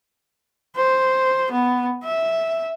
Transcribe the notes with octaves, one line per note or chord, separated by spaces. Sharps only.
C5
B3
E5